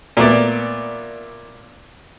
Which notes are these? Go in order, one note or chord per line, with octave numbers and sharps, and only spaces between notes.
A#2 A3 B3 D5